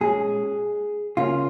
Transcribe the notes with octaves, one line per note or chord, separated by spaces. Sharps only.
A#2 G#3 C#4 G#4
C#3 A#3 C#4 F4